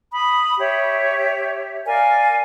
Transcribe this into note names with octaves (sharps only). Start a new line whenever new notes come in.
B5 D#6
G4 C#5 E5
A#4 D5 F5 G#5